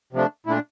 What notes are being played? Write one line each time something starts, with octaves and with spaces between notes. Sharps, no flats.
C3 F3 A3 D4
A#2 A3 D4 E4